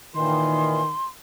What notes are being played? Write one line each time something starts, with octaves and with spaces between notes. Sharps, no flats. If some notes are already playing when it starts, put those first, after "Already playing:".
A#2 D#3 E3 C6